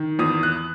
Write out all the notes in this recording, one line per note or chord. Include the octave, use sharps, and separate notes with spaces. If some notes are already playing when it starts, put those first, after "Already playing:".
Already playing: D#3
E2 D#6
F#6